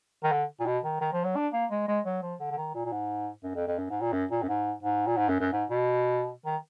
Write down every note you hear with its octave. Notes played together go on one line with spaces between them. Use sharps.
D#3
D3
A#2
B2
D#3
D#3
F3
F#3
D4
A#3
G#3
G#3
F#3
F3
D3
D3
D#3
A#2
A#2
G#2
F#2
F2
F2
F#2
G#2
A#2
F#2
A#2
F#2
G#2
G#2
A#2
G#2
F#2
F#2
G#2
B2
D#3